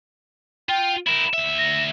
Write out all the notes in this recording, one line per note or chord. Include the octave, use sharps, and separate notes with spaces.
F4 G5
E4 A#4 E7
D2 E5
A#6